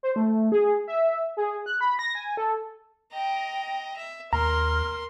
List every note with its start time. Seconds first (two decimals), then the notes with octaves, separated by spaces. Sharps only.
0.03 C5
0.16 A3
0.52 G#4
0.88 E5
1.37 G#4
1.66 F#6
1.81 B5
1.99 A#6
2.15 G#5
2.37 A4
3.13 D#5 G5 A#5
3.97 E5
4.33 D#2 A#4 A#5 C6 F6